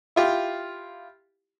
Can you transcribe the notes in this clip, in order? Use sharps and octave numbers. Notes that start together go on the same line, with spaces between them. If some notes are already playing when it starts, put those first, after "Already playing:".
E4 F4 G4